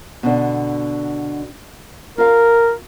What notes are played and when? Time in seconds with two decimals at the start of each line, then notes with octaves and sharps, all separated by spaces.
0.23 B2 D3 D4
2.18 F4 A#4 F5